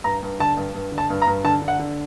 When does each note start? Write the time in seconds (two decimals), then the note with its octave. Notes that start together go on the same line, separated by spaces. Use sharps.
0.04 G2 A#5
0.23 G2
0.39 D3 A5
0.57 G2
0.74 G2
0.92 D3
0.98 A5
1.10 G2
1.22 A#5
1.27 G2
1.44 D3 A5
1.62 D3
1.68 F#5
1.79 D3